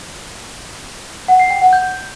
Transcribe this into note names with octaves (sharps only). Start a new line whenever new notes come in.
F#5
C7
G5
F#5
G6